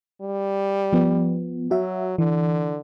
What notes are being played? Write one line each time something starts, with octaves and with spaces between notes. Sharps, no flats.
G3
F3 B3
F#3 F#4 E5
D3 E3